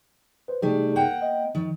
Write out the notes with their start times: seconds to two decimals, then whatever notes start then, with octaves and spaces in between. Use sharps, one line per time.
0.48 B4 C5
0.62 C3 G3 A3 D#4 G#4
0.96 A#3 F#5 G5
1.22 D#5
1.55 D#3 F3